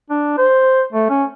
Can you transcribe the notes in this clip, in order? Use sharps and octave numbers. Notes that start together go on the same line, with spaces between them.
D4
C5
A3
C#4